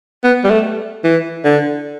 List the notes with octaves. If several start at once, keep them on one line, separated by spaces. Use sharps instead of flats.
B3
G3
A3
E3
D3